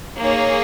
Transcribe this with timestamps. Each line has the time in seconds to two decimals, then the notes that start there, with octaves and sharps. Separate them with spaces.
0.21 A#3 D#4 G#4 C#5